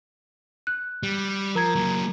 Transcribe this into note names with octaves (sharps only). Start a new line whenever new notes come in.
F#6
G3
F3 A#4 A#5 G#6
F#3 A#3